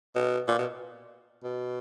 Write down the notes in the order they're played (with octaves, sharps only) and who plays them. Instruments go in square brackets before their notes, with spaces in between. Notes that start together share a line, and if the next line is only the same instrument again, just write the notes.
[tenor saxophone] B2
A#2
B2
B2